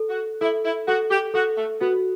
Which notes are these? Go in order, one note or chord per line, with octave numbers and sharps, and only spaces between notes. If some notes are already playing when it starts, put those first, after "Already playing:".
Already playing: A4
F#4
E4 A4
E4
F#4 A4
G4
F#4 A4
A3
B3 F#4